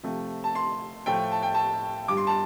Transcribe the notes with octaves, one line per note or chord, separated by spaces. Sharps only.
C3 F3 A3
A5
C6
A2 F3 A3 G5
A5
G5
A5
G2 G3 D6
C6
A5